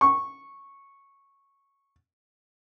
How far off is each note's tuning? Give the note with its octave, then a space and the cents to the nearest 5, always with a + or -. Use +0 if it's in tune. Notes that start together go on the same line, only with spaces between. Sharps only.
C#6 -10